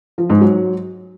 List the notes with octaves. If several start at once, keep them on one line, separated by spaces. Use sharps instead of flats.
F3
G#2
F#3